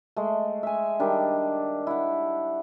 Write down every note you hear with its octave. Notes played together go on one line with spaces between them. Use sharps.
G#3 A3
E5 G#5
D#3 G3 D4
E4 F#5